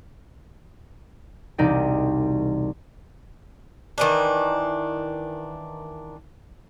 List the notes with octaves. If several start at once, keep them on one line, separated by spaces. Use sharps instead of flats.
E1 C2 D#4 D5 G5
D#3 E3 D4